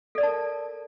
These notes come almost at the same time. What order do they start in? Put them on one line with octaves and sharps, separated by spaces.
A4 D5 A#4 A5